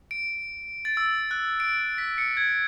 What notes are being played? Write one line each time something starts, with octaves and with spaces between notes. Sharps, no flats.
D7
A6
E6
F#6
D7
B6
C#7
G#6